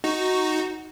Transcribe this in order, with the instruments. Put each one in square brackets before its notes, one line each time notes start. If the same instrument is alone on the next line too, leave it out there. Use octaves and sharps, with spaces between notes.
[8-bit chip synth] D#4 F#4